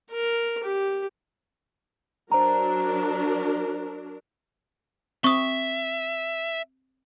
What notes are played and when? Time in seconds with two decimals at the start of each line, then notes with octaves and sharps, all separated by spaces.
0.11 A#4
0.63 G4
2.32 F#3 D4 A#4 C5 A#5
5.24 C4 E5 C#6 D#6